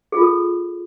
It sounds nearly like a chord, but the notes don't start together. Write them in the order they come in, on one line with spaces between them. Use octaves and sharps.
G#4 F4 A4